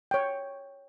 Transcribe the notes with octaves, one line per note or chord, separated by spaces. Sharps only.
C#5 G5